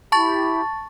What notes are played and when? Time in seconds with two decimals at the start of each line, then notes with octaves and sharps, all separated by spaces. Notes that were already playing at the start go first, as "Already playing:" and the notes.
0.12 E4 G4 A5 B5 C#6 A6